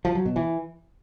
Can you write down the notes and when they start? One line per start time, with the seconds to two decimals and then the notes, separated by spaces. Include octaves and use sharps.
0.05 F3
0.15 F#3
0.25 B2
0.36 E3